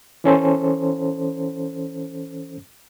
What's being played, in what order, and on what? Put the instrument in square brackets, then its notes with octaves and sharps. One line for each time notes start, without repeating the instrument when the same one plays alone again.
[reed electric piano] E3 C#4 A4 C5